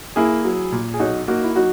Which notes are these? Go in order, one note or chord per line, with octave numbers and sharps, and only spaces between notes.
A#3 E4 G#4
F#3
A#2
G#4
B1 D#4 F#4
A#3 D#4 F#4
E4
F#3 D#4 F#4